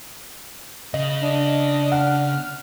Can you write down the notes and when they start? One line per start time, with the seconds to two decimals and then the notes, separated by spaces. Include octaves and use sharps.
0.94 C#3 D#5
1.22 D4
1.92 F#5 F6